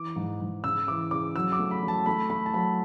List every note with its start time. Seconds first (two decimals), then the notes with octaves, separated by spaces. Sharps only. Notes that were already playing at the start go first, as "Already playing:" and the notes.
Already playing: E3 D6
0.16 G#2
0.41 G#2
0.63 C#3 E6
0.88 E3 D6
1.11 C#3 D6
1.35 F#3 E6
1.53 D6
1.59 A3
1.71 B5
1.83 F#3
1.88 A5
2.06 A3 B5
2.30 A3 B5
2.46 A5
2.54 F#3 B5